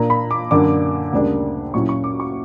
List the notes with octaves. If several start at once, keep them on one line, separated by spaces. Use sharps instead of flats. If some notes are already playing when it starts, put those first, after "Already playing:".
Already playing: A#2 A#3 D4 A#5
B5
D6
F#2 D3 A#3 D4 D6
D2 C#3 G3 A#3 D4
A#2 F#3 C#4 E4 C#6
C#6
D6
C#6